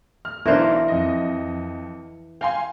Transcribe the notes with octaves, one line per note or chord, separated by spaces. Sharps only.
F6
B1 E3 D4 A#4 C5
F2 D#5
F5 G5 G#5 C6